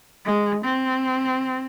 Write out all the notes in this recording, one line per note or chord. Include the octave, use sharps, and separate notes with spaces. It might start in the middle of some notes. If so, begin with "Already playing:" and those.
G#3
C4